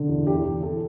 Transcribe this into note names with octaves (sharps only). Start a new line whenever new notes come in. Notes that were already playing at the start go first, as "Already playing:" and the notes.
Already playing: D3
E2
E2 G4
E2
E2 A4